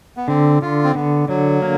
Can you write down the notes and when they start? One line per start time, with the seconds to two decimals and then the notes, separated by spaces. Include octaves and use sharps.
0.17 B3
0.28 D3 C4
0.62 D3 F4
0.84 C4
0.95 D3 B3
1.28 D3 F#3
1.62 A#3